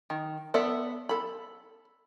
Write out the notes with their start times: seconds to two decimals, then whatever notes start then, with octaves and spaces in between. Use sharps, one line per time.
0.10 D#3
0.54 B3 A4 D5 E5
1.09 A4 B5